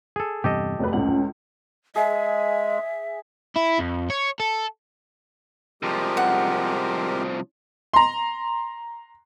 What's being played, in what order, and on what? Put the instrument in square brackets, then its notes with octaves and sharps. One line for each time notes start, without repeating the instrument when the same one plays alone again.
[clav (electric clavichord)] G#4 A4
[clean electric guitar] E2 G2 C3 [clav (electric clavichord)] G4 A4 D#5
[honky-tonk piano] F1 D2 B4
[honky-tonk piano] C#2 A2 [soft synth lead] C#4 [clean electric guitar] F#5
[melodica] G#3 [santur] G#4 [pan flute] E5
[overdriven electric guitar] E4
F2
C#5
A4
[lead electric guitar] C2 F3 [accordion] G#3 G4 A#4
[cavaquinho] F#5
[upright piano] A#5 C6